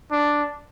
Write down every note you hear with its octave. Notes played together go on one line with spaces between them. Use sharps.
D4